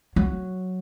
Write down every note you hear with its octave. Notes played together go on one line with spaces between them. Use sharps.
F#3